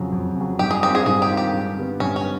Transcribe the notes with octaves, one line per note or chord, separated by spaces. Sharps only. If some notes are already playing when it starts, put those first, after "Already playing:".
Already playing: F2 C#3 F#3
F2
C#3 F#3
G2 G4
G#4
D#3 G#3 C4 F4 G4
G#4
G2 G#4
G4
D#3 G#3 C4 F4
G4
G2
D3 G3 B3
G2 C#4
C#4
B3